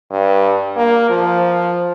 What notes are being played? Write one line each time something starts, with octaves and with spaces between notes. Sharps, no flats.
G2
A#3
F3